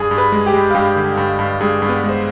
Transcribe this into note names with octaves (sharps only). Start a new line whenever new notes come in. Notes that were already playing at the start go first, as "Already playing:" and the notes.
Already playing: G2 G#4 G#5
G2
B4 B5
G#3
G4 G5
G#3
F5
G2 G4 G5
D3
G2
G2
G2 G#3 G#4
G2
B3 B4
G#3
C5